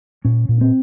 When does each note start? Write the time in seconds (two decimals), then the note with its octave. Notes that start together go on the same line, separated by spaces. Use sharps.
0.25 A#2 C#4
0.49 A#2
0.61 C4